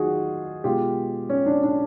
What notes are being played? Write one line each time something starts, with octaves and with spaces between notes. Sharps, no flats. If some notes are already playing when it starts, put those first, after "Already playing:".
Already playing: D#3 F#3 A3 D#4 F4 F#4 G#4
B2 G#3 F4 G4
C#4
D4
D4